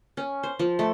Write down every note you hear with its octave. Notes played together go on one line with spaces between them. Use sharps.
C#4
C5
F3
A3